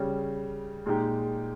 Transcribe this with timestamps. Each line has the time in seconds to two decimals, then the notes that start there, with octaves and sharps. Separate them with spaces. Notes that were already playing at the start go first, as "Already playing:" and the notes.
Already playing: C#3 G3 C#4
0.86 A#2 G#3 D#4 G4